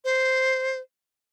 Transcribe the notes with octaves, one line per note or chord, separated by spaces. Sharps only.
C5